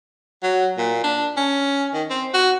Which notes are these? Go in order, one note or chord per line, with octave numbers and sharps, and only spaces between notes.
F#3
A#2
D4
C#4
D#3
C4
F#4